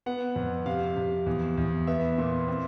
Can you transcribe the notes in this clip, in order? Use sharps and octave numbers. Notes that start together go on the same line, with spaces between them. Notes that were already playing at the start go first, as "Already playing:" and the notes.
B3 F#5
F2
C3 F5
C3
E2
E2
B3 E5
A#2
C4